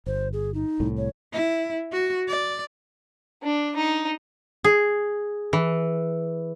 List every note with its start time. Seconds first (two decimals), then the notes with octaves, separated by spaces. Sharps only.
0.06 G1 C5
0.33 G#4
0.54 D#4
0.80 C2 A2
0.97 C#5
1.33 E4
1.92 F#4
2.28 D5
3.43 D4
3.76 D#4
4.64 G#4
5.53 E3